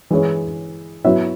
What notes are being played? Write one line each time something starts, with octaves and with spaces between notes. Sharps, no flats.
E3 G#3 E4 G#4 C#5
F#3 B3 E4 C#5 E5